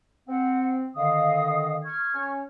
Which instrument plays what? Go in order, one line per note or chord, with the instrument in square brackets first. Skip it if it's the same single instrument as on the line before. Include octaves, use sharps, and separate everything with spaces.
[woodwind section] C4 [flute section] F#5
[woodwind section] D3 D#3 [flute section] D#5 F5 D#6
[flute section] C#6 F6 G#6
[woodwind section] C#4